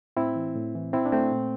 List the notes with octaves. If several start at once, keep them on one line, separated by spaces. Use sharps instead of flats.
A2 C4 E4
E3
A2
E3
A#2 C4 E4
D4
A3 C4
A#2